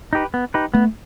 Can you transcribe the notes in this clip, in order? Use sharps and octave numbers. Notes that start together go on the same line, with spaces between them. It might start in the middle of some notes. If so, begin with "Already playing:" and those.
D#4 G4 B4
B3
D#4 G4 B4
A3 B3